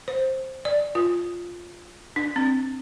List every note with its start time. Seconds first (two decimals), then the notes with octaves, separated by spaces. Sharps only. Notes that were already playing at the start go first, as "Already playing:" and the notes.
0.08 C5
0.65 D5
0.95 F4
2.16 D4
2.36 C4